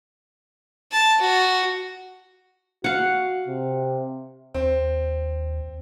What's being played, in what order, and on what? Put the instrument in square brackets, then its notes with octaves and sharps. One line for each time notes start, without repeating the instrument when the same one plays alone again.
[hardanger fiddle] A5
F#4
[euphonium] F#4 [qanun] F5 F#5
[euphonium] C3
[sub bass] D#2 [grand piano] C4